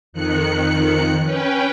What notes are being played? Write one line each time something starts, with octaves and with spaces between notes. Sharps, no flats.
F2 D#3 F#6 C#7
C#4 B4 G5